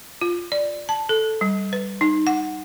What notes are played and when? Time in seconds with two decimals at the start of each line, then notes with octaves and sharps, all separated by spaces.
0.21 F4
0.52 D5
0.89 A5
1.09 A4
1.41 G3
1.73 B4
2.01 D#4
2.27 F#5